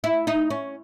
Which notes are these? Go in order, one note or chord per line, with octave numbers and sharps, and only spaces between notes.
E4
D#4
C#4